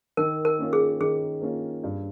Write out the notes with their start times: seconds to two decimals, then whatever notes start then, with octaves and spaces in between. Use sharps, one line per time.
0.17 D#3 A#4
0.45 A#4
0.58 A#3 C#4 F4
0.73 G#4
1.01 D#3 G#4
1.42 A#3 C#4 F4
1.84 G2